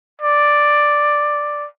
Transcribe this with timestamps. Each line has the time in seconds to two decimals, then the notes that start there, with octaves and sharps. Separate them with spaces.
0.21 D5